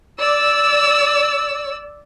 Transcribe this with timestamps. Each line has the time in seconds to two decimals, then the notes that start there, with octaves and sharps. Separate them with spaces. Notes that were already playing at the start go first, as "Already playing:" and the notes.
0.20 D5 E6